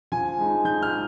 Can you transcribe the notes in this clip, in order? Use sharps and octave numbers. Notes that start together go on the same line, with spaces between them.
F3 G#5
G#3 D#4
F3 G6
F6
G#3